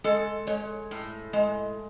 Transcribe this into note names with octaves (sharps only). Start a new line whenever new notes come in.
G#3 A4
G#3 C#5
A2
G#3